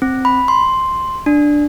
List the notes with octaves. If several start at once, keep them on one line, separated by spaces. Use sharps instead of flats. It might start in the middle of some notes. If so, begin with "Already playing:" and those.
C4
B5
C6
D4